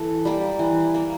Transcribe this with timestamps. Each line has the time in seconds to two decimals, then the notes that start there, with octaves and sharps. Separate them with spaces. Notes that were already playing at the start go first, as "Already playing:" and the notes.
Already playing: E3 A4
0.25 G3 A#3
0.59 E3
0.94 A#3